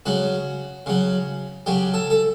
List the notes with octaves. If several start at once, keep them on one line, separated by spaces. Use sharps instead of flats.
C#3 F#3 F#4
C#3 F#3
C#3 F#3 G4
A4
A4